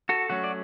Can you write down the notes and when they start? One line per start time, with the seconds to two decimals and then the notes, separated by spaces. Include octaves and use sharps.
0.09 F#4 A4
0.30 F#3 A3 C#4 F#4
0.44 D5